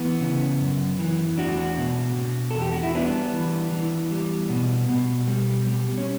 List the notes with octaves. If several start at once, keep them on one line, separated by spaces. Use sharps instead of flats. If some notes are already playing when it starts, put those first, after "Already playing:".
Already playing: E3 B3
C#3
F#2
E3
E2 D4 F#4
B2
B2
A4
E2
G4
F#4
E4
G3 B3 D4
E3
E3
G3
B2
B2
G3
G3
C#4